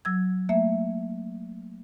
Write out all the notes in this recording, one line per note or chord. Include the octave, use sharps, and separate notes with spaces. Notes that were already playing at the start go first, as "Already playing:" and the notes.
F#3 E6 G#6
A3 A#3 E5